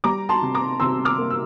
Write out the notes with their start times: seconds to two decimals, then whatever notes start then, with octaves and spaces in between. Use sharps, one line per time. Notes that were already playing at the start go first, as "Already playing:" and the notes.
0.04 G3 A#5 D6
0.29 A5 C6
0.42 C3
0.55 A#5 D6
0.80 C3 C6 E6
1.05 D6 F6
1.18 A#3
1.30 E6